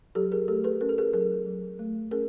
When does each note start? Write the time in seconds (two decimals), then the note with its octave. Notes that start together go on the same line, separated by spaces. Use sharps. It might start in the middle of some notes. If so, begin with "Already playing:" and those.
0.15 F#3 G4 A4
0.32 G#4 A#4
0.48 A3 G4 A4
0.64 A4 B4
0.81 C#4 A#4
0.89 A4
0.98 G#4 A#4
1.13 F#3 G#4 A#4
1.46 F#3
1.79 A3
2.11 C#4 G#4 A#4